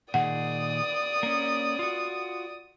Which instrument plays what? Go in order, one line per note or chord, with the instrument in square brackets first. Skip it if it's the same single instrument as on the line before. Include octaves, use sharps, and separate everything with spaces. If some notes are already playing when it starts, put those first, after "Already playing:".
[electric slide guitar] A#2 D#3 G#4 [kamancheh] D5 D#6 [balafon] F#5
[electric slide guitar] A#3 C#4
F4 F#4